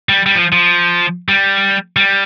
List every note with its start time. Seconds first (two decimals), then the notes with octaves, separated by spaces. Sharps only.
0.09 G3
0.26 G3
0.35 F3
0.53 F3
1.29 G3
1.96 G3